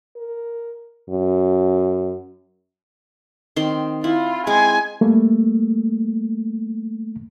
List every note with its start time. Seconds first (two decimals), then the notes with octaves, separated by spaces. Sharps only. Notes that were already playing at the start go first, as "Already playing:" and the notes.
0.17 A#4
1.09 F#2
3.56 D#3 C4 C6
4.04 E4 F4
4.47 G#3 C4 G#5
5.01 G3 A3 A#3